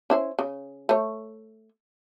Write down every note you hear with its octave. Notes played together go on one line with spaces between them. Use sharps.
C#4 E4 C5
C#3
A3 C#5